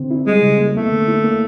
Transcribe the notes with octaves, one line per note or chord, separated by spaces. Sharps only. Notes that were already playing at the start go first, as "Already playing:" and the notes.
Already playing: D3 C4
E4
G3 G#3
C#3
A#3
A3 B3
D3
E4
A#3